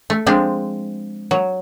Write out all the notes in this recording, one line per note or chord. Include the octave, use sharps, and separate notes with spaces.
A3
F3 G#3 C4 D4
F#3